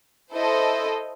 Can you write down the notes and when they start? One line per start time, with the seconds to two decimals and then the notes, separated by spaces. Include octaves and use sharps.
0.33 E4 A4 C5 D#5